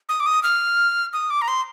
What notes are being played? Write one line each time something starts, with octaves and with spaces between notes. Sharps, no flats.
D#6
D6
D#6
F6
D#6
D6
A#5
C6